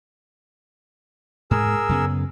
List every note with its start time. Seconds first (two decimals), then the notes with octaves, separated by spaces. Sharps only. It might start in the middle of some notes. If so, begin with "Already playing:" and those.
1.51 G#2 G#4 A#4 E6
1.89 F#2 C#3 B3